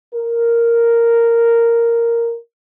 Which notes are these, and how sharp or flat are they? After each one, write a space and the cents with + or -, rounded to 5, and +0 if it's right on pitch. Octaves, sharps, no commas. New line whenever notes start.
A#4 -5